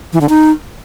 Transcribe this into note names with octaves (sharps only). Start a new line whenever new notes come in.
E3
D3
D#4